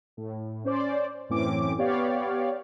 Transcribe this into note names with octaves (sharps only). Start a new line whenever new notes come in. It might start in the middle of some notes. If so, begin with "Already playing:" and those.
A2
C#4 C5 D5
F#2 A2 E3 C4 C#4 D6
B3 G4 C#5 D5 F5